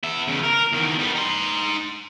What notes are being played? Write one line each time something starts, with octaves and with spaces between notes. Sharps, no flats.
B3 E5
E2 C#3
A#4
E2 D#3
G3 B3
D#4 C6